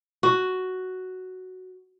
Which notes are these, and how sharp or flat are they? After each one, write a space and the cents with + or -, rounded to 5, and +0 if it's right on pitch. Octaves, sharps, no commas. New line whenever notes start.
F#4 +5